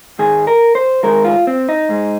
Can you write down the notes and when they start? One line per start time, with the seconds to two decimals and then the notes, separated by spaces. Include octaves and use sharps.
0.19 G#2 D#3 G#3 G#4
0.47 A#4
0.75 C5
1.03 G#2 D#3 G#3 A#4
1.25 F4
1.47 C4
1.69 D#4
1.89 G#2 G#3